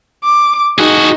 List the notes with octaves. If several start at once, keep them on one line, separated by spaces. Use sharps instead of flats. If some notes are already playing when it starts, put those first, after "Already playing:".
D6
D#4 F#4 G#4